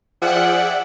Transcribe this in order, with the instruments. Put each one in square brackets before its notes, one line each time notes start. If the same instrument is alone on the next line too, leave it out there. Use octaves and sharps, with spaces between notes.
[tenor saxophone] F3 [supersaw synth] G#4 D5 E5 [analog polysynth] F#5 G5